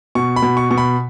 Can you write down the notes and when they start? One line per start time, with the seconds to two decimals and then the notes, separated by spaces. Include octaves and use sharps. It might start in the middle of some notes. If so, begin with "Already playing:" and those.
0.15 B2 C#6
0.36 B5
0.42 B2
0.57 C#6
0.71 B2 C#6
0.78 B5